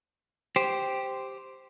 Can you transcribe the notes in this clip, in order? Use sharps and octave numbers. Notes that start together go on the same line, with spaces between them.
G4 C5